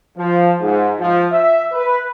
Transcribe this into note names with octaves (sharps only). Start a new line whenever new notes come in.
F3
G#2
F3
E5
B4